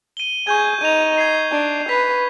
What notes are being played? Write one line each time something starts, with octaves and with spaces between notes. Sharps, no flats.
D#7 G7
G#4 C#6 G6 G#6
D#4 D#7 F7
G#6 C7
D4
B4 B6 F7